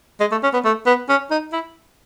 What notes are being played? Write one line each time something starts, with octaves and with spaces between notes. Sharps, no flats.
G#3
A3
C#4
B3
A3
B3
C#4
D#4
E4